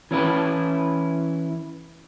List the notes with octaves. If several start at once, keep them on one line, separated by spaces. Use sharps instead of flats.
E3 C#4 E4 B4